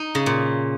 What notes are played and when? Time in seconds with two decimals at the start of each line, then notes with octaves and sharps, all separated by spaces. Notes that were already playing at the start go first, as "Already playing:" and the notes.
Already playing: D#4
0.15 C#3
0.26 A#2